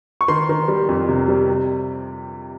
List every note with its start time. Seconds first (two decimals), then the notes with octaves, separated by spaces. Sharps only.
0.21 C#6
0.28 D#3 C6
0.49 D#3
0.68 G3
0.89 F2
1.08 C3
1.28 G3
1.48 C3